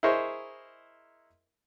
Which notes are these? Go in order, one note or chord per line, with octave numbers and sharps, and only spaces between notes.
E4 G#4 A#4 C5 C#5 D#5